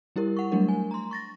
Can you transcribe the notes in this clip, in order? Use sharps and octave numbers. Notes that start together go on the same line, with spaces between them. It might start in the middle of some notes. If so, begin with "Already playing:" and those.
G3 E4 G4 A#4
F#5 C#6
F#3 G3 A3 D4 A#4
G#5
A#5 C6
C#6 A6 A#6